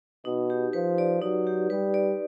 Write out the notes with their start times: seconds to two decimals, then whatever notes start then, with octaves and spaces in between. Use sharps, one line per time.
0.25 B2 D#4
0.50 G4
0.73 F3 B4
0.98 D5
1.22 F#3 D#4
1.47 G4
1.70 G3 B4
1.94 D5